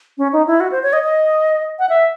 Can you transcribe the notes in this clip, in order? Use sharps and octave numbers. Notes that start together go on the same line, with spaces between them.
C#4
D#4
E4
F#4
C5
C#5
D#5
D#5
F#5
E5